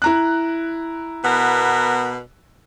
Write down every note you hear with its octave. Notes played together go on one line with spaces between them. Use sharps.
E4 A#5 F#6
B2 B3 A#4